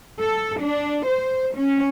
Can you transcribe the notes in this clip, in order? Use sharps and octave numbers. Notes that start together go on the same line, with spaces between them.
A4
D4
C5
C#4